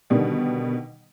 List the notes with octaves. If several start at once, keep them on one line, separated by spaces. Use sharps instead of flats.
B2 D3 D#3 G3 B3